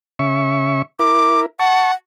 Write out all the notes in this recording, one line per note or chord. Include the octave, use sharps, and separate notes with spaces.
C#3 E5 C#6
E4 A#4 D6
F#5 A5 C#6